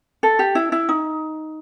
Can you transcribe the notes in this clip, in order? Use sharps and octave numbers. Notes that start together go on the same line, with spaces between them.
A4
G4
E4
E4
D#4